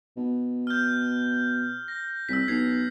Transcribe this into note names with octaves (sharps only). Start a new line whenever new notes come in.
B2
F6 G6
A#6
C2 E6 B6
B1 G#6 C7